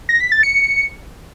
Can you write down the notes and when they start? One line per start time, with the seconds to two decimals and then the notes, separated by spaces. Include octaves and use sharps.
0.09 A#6
0.20 B6
0.32 A6
0.43 C#7